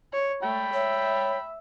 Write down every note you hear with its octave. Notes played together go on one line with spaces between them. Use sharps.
C#5
A3 G5 B5
C#5 E5